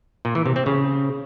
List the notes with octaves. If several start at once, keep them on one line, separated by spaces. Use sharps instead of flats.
A#2
E3
C3
C4
C#3